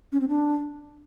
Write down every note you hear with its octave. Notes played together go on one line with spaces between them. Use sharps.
C#4
C4
D4